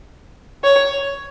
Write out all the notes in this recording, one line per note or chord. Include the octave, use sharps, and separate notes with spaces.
C#5